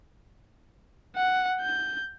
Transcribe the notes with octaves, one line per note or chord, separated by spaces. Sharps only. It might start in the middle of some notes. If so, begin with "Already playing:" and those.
F#5
G6